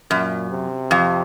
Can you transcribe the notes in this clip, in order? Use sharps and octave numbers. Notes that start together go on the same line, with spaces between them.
F#2 A#2
C3
F2